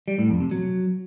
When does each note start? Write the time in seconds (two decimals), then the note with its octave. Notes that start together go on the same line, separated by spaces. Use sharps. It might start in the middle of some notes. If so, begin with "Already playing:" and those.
0.08 G3
0.18 A2
0.29 F2
0.40 C3
0.51 F#3